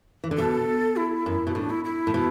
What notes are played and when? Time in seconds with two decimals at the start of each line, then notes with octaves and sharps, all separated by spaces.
0.24 E3
0.31 D3
0.38 B2 A4
0.96 E4
1.26 F#2
1.47 B2
1.55 A2 D4
1.70 E4
1.85 E4
2.07 A2
2.14 B2